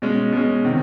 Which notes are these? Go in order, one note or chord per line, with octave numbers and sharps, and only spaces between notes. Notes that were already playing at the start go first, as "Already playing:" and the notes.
B2 G#3 C#4
B2 G#3 C#4
C3 D#3